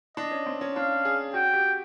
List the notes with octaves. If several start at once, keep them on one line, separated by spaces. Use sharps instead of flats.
D4 D#5
C#4
C4
C#4
D4 F5
G#4
F#4 G5
G4